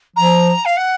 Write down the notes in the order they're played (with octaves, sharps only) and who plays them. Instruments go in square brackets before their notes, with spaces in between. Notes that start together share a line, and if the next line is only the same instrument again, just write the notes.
[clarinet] F3 [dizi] A#5
[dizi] F5
F#5